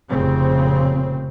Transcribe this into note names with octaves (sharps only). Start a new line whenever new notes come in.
F1 A#2 C#3 C4